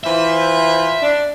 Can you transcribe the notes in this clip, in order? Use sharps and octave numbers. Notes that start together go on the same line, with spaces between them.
E3 F4 C5 E5
D4